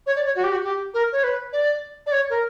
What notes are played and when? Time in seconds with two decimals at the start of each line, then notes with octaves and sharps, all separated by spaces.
0.06 C#5
0.16 D5
0.26 C#5
0.36 F#4
0.44 G4
0.52 F#4
0.64 G4
0.94 A#4
1.12 C#5
1.24 B4
1.53 D5
2.06 D5
2.12 C#5
2.30 A#4